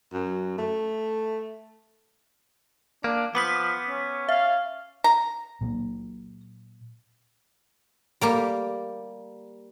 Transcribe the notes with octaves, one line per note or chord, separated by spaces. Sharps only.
F#2
A3
A#3 D4
F3 B3 B4 D6 D#6 B6
C#4
E5 F5
A#5
A#2 F#3 A#3
G3 A#3 G4